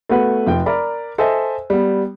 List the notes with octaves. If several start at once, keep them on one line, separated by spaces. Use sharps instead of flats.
A3 B3 F#4 B4 F#5
F1 F3 G5
A#4 D5 A#5 B5
A4 C5 D#5 E5 G#5
G3 B3